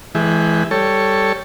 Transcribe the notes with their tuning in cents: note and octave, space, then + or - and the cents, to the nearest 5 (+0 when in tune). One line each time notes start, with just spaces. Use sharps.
E3 +0 G#3 +30 G4 +25
G3 +0 A4 +10 C#5 +0